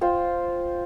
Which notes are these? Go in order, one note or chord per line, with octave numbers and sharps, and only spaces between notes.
F4 C5 G5